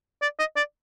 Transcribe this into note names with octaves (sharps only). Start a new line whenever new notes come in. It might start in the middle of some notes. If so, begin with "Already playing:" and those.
D5
D#5
D5